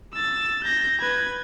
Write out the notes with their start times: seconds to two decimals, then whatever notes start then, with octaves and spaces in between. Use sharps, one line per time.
0.14 E6 A6
0.63 G6 A#6
1.00 B4 G#6